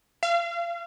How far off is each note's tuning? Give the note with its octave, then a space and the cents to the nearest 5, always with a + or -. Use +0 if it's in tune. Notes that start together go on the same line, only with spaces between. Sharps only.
F5 -35